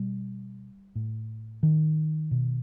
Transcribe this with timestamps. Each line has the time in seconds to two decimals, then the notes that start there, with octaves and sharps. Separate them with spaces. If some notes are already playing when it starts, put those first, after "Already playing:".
Already playing: B2 G3
0.95 A2
1.63 D#3
2.31 B2